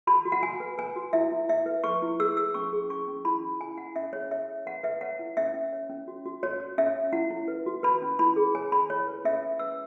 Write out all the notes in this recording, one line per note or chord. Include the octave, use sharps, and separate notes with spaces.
F#4 B5
F#4
F#5
F#4 G#5
B4
B4 G#5
F#4
E4 E5
E4
E4 E5
B4
B4 C#6
E4
G#4 E6
G#4 E6
C#4 C#6
G#4
C#4 C#6
C#4
E4 B5
C#4
E4 G#5
E4 F#5
C#4 E5
G#4 C#5
C#5 E5
C#5
B4 F#5
B4 E5
C#5 F#5
E4
C#4 E5
C#4
C#5
C#4
F#4
F#4
F#4 C#5
C#5
C#4 E5
C#5
E4 F#5
E4
B4
F#4
B4 B5
C#4
E4 B5
G#4
C#5 G#5
C#5 B5
E4 C#5
B4
C#4 E5
C#4
B4 E6